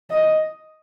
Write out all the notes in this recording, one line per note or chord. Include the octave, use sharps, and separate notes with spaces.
D#5